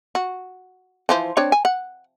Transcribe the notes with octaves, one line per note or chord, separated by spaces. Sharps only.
F#4
E3 F3 C5
C4 D4 C#5
G#5
F#5